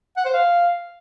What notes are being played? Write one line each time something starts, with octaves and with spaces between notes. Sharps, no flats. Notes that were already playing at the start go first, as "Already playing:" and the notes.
F#5
C5
F5